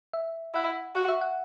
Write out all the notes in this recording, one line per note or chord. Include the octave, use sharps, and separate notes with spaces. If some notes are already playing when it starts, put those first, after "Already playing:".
E5
E4 F#5
F#4 F#5
E5
F#5